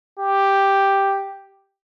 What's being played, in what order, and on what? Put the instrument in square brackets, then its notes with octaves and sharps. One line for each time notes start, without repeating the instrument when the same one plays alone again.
[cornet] G4